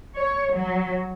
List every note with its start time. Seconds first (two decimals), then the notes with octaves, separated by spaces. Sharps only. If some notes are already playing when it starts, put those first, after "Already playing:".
0.16 C#5
0.51 F#3